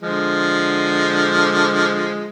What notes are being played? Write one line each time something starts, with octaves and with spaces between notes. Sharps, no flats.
D3 F3 G#3